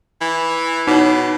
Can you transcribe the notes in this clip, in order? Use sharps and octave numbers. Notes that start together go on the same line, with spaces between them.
E3
B2 D#4 C#5